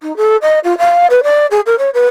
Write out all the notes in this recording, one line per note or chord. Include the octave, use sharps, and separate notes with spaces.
D#4
A4
D#5
F4
F5
B4
D5
G#4
A#4
C#5
B4